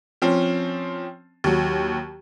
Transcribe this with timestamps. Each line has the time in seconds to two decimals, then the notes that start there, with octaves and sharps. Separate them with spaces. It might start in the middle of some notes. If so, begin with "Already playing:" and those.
0.22 F3 C4 C#4
1.44 D#2 F#3